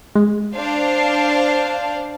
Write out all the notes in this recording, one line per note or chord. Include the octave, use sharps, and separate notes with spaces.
G#3
D4 C5 F5